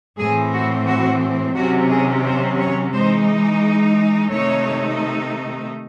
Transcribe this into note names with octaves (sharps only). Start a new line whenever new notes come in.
A2 E3 C4 G#4
F#4
F#4
C3 D#3 F#3 C#4 F#4
G#4
C5
C#5
E3 G#3 D#4 C5
C3 D#3 A3 D#4 C#5